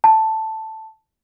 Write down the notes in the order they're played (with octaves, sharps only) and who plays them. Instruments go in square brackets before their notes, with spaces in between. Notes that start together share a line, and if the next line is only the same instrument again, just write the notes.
[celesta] A5